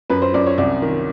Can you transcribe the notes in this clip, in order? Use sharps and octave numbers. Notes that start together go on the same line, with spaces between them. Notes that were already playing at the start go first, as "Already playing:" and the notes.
F#2 B4
C5
F#2 D5
C#5
C2 D5
D#3